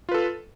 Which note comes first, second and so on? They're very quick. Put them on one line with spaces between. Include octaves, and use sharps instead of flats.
F4 B4 A4